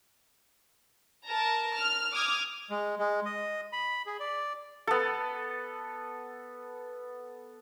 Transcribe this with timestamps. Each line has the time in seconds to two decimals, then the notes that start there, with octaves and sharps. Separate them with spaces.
1.26 A#4 A5 A#5
1.77 F6
2.13 D6 D#6 F6 G#6
2.70 G#3
2.99 G#3
3.25 D#5
3.73 B5
4.06 G#4
4.20 D5
4.87 B3 A4